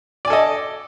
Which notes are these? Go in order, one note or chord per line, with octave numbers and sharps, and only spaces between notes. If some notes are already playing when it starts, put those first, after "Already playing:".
A4 D5 D#5 G#5